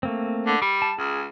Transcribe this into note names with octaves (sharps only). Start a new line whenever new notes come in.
A3 A#3 C4
D3
G3 D6
A5
C#2 G#4